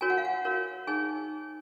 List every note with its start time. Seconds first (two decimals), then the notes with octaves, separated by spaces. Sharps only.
0.01 F#4 A#4 C#5 G#5
0.10 F#5
0.17 F5
0.25 F#5
0.45 F#4 A#4 C#5
0.87 D#4 G#4 C#5 G#5